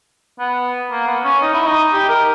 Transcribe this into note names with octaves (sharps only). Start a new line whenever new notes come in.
B3
A#3
B3
C#4
D#4
E4
D#4
G4
A#4